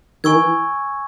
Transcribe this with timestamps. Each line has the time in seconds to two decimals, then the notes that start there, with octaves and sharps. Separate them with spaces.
0.24 D#3 G#5 C#6 E6 G#6
0.35 E3